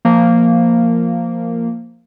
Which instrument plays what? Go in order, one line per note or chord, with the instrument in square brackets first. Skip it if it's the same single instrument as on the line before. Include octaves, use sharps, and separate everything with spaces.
[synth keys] F3 A#3